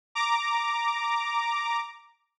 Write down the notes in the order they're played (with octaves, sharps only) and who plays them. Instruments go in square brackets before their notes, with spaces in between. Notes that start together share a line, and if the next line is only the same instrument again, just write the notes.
[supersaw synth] A#5 D6